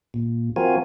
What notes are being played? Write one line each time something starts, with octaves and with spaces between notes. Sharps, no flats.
A#2
F3 C4 F4 F#4 A#4 G#5